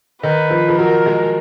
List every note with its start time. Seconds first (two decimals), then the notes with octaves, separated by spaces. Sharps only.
0.23 D#3 B4
0.50 F3
0.69 F3
0.78 F#3 A#4
1.06 G#3